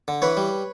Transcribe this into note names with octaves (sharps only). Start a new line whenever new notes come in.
D3
E3 B4 C#5
G3